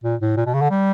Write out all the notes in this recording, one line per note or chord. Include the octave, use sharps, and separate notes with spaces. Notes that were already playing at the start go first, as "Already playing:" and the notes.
A#2
A2
A#2
B2
C#3
D3
G3